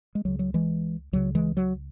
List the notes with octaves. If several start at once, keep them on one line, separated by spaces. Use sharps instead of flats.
G#3
C#2 C#3 F#3
F#3
E3 G#3
C#2 C#3 F#3
E3 G#3
F#3